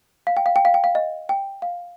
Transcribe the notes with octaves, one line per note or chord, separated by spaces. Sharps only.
F5
G5
F5
G5
F5
G5
F5
D#5
G5
F5